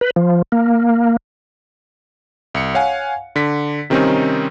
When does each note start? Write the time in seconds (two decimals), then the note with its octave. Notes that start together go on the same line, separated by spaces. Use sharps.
0.01 B4
0.16 F3
0.52 A#3
2.55 C2 C#7
2.75 C#5 F5 F#5 G#5
3.36 D3 B6
3.90 C3 D#3 G3 C4 C#4 D#4